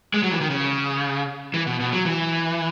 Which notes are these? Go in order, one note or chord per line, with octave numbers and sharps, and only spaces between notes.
G#3
F#3
E3
D#3
C#3
E3
B2
B2
F#3
E3